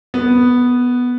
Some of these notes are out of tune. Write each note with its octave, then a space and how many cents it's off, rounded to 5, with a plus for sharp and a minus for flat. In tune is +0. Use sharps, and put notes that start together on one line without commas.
B3 +0 A#4 -45